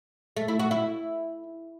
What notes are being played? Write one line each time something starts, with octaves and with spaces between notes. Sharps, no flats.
A3
E4
F#4
E4